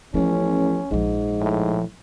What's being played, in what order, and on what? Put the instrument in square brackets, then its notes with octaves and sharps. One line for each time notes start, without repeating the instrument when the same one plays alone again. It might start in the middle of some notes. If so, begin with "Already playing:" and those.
[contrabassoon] A1 [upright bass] F3 B3 [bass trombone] C#4
[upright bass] A#1 F3 [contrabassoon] G#2
[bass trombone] A2